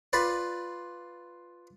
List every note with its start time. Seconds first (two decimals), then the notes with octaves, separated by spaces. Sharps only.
0.13 F4 B4 D5